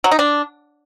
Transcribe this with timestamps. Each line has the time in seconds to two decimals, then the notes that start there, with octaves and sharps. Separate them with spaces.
0.04 F#3
0.11 D#4
0.19 D4